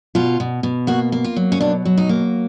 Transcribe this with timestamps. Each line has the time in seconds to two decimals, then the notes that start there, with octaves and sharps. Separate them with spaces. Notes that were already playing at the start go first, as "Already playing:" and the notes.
0.15 B2 F4
0.40 B2
0.63 B2
0.87 A#3 F#4
1.12 A#3
1.24 F4
1.36 F#3
1.52 C#4
1.61 B2 D4
1.85 F#3
1.98 D#4
2.09 A#3